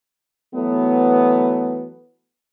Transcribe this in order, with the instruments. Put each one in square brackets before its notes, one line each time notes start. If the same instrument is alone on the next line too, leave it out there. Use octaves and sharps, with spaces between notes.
[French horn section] E3 F#3 A3 B3